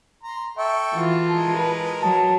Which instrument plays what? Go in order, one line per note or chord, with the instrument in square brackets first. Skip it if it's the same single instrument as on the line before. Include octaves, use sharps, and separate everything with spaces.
[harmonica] A#5 C6
[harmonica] A4 G5 C#6 [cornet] E5
[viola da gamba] E3 F4 [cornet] F#4
[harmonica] G#3 A#4 [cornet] A5
[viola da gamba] B4
[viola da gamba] F#3 [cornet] A5